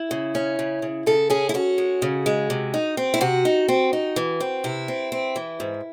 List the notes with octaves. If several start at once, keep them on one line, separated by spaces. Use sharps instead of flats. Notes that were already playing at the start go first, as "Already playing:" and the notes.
Already playing: E4
C#3
C#4
C#3
C#3
C#3 A4
C#4 G#4
E4
C#4 F#4
G#3
C#3
G#3
C3
D#4
C4
E4
C3 F#4
D#4
C4
D#4
E3
C4
C3 E4
C4
C4
E3
G#2